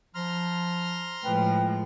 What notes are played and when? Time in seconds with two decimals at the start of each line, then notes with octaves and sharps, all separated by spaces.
0.15 F3 A#5 C6 F6
1.24 A2 F3 G#3 B4 G5